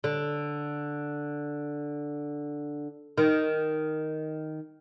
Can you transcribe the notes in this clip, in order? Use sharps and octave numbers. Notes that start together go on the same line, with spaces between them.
D3
D#3